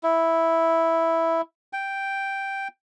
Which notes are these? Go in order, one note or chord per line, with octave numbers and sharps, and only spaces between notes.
E4
G5